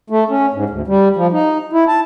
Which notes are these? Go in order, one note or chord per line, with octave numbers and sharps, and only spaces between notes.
A3
C#4
G#2
D2
G3
F3
D#4
E4
A5